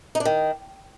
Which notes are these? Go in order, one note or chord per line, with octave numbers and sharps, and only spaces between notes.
D#4
D4
D#3